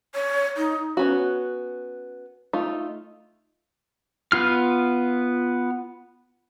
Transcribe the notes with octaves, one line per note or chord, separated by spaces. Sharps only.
C#5
D#4
B3 C#4 F#4
A3 D#4 F4
B3 F4 F6